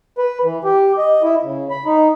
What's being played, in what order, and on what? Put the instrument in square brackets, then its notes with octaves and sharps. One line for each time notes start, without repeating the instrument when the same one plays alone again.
[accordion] B4
E3
G4
D#5
E4
C#3
B5
D#4